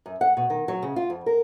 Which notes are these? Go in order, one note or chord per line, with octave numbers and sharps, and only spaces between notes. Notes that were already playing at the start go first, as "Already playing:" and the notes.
F#2
F#5
B2
D#3
F#3
C#3
F4
F2
A#4